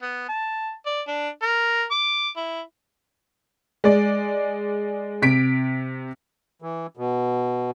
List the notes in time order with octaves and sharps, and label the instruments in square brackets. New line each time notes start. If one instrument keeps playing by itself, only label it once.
[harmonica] B3
A5
D5
D4
A#4
D6
E4
[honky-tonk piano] G#3 D5
C3 B6 D7
[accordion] E3
B2